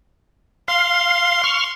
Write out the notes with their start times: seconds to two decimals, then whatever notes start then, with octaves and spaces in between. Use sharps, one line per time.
0.68 F5 C6
1.44 C#6 F6